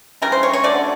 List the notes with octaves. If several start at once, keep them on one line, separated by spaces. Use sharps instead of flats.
C#3 E3 G3 A#4
C5
C#5
C#5
D3 F#3 A3 D5